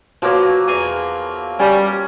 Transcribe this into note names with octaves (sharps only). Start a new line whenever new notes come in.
B2 F3 F#3 A#3
E2 F5 G#5
G3 C#4